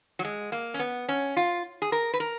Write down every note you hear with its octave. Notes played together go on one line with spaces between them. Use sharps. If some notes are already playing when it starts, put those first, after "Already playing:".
F#3
G#3
A#3
C#4
B3
C#4
F4
G#4
A#4
B4
A#4